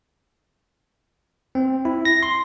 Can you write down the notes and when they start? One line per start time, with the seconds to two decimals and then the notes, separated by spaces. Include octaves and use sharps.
1.55 C4
1.85 E4
2.05 A#6
2.23 C6